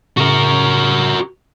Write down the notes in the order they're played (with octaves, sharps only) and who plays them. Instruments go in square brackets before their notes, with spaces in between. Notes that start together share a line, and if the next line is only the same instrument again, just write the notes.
[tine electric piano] A2 C#3 [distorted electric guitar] F#4 A#4